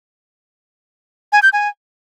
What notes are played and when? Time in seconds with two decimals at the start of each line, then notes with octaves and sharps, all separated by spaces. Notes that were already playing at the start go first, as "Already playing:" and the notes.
1.32 G#5
1.43 G6
1.53 G#5